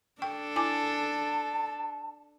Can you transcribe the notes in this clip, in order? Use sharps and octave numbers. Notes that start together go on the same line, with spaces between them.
D4 A4 G5
E4 G#5 A5 D6